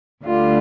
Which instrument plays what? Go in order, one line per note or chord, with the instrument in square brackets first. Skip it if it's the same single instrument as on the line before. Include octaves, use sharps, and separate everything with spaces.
[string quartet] D2 D3 G3 F4